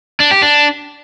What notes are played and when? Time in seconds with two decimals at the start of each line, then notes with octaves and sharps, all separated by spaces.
0.20 D4
0.31 G4
0.42 D4